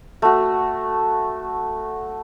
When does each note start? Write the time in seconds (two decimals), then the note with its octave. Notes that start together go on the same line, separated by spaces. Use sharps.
0.22 A3 F#4